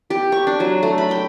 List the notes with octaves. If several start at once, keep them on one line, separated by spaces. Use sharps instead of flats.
G4
C#6
D4
F#3
A3
B5
G5